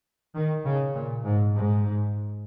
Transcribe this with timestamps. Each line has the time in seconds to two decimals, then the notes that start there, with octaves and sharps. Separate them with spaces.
0.36 D#3
0.66 C#3
0.95 A#2
1.25 G#2
1.54 G#2